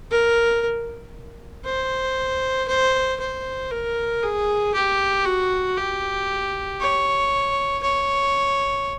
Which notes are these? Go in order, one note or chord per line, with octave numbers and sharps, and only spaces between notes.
A#4
C5
C5
C5
A#4
G#4
G4
F#4
G4
C#5
C#5